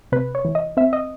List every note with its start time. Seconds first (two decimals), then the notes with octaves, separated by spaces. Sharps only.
0.12 C3 B4
0.35 C#5
0.45 E3
0.55 D#5
0.77 C4 E5
0.93 D#5